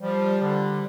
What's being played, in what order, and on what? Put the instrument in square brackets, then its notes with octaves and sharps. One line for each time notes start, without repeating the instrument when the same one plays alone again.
[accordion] F3 G3
D3